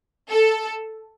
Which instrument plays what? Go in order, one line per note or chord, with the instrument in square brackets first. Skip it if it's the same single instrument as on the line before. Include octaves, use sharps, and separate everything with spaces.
[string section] A4